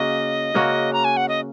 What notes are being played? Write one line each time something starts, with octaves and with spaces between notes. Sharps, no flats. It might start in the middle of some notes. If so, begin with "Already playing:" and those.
Already playing: C#3 A#3 C#4 F#4 D#5
C#3 A#3 C#4 F#4
A#5
G#5
F#5
D#5